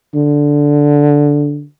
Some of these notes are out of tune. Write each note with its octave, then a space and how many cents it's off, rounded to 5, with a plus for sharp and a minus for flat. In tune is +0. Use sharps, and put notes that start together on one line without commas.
D3 -5